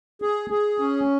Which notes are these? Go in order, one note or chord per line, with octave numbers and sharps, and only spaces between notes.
G#4
G#4
C#4